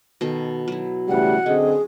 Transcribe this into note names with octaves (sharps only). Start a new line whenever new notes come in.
B2 D#3 A4
F#3 E4
C#3 E3 G3 A3 F#5
D3 C4 C#4 G#4 D#5